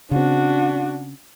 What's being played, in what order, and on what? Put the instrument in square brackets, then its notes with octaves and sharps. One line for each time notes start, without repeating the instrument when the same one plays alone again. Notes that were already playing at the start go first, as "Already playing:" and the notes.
[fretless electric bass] C#3 C4 [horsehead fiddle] D4 F#4